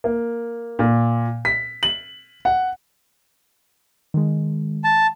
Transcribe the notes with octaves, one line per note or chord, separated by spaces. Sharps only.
A#3
A#2
B6
F#7
F#5
D#3 G#3
A5